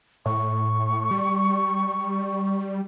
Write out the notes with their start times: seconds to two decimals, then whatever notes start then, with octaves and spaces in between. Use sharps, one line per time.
0.26 A2 C#6
1.11 G3